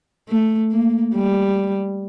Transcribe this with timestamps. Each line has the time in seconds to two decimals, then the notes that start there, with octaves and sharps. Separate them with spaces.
0.29 A3
0.72 A#3
1.14 G3